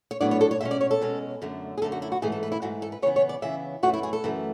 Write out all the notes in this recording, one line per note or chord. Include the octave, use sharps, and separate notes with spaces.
C#5
A2 F#3 B3 D4 D5
C#5
A4
C#5
B2 G#3 C#4 E5
D5
C#5
A4
B2 G#3 C#4
F#2 D3 A3
G#4
F#2 D3 A3 A4
F#4
E4
F#4
G#2 E3 A3 G#4
A4
B4
E4
G#2 E3 A3 F#4
A4
B4
C#3 E3 B3 C#5
C#5
D5
C#3 E3 B3 E5
F#2 E3 A3 F#4
E4
G#4
A4
F#2 E3 A3